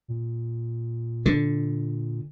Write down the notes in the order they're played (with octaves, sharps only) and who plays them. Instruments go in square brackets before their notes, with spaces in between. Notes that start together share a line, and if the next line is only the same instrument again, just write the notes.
[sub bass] A#2
[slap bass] D3